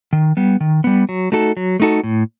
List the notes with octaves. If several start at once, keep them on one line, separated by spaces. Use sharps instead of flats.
D#3
G3 B3
D#3
G3 B3
F#3
A3 D#4 F#4 A4
F#3
A3 D#4 F#4 A4
A2